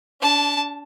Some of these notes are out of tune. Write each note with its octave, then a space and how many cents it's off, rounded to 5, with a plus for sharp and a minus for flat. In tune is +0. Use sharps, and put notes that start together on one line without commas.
D4 -35 A5 +0